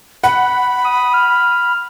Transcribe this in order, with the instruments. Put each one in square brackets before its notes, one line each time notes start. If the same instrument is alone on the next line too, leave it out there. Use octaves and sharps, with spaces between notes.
[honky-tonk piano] F#5 [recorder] B5
[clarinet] D#6
F6